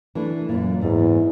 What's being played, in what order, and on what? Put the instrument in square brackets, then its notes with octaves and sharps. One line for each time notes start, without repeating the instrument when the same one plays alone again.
[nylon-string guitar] E3 A3 D4
F#2 A#2
[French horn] E2 [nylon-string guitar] G#2